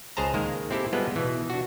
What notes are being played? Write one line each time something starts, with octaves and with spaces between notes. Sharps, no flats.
C#2 G#4 C5 A5 A#5
D#3 G#3 A#3 A#4
C4 E4 G4 A4
G3 G#3 B3 F4 A4 B4
B2 E3
D4 F#4